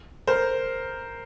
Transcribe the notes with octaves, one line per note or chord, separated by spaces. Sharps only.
A#4 C5